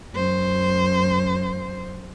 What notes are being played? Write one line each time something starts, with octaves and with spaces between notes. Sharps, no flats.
F#2 C5